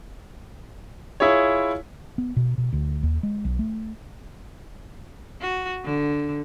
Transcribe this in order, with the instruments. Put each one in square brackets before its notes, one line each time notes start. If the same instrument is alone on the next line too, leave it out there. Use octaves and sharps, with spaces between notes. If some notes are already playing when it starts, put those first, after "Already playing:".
[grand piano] E4 F4 G#4 C#5
[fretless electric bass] B3
B2
B2
D2
D#2
G#3
B1
A3
[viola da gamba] F#4
D3